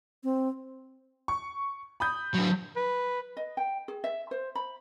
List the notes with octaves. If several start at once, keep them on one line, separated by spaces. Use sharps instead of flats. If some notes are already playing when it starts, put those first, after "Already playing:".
C4
C#6
B5 D#6 G6
D3 F#3
B4
D#5
G5
G#4
E5
C5
B5